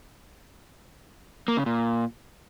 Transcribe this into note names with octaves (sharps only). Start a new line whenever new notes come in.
A#3
C#3
A#2